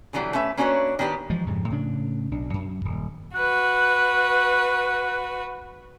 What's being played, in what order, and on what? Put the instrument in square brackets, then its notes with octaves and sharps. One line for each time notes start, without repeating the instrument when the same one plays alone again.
[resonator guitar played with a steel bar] B2 D3 E3 F#3 G3
A3 C#4 B4 E5
A#3 C#4 D4 F#4 B4 C#5
D#3 B3 D4 G4 B4
[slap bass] E3 F3 G#3
F2 G#2 C#3
A2 C#3 D4
B1 D4
F#2
D#1
[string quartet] F#4 B4 [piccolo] F#6